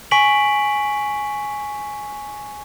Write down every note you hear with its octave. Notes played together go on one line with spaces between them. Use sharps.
G#5 C#6 B6 D7 F#7